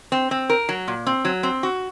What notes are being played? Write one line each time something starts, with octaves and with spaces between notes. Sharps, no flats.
C4
C4
A#4
F#3
A#2
C4
F#3
C4
F#4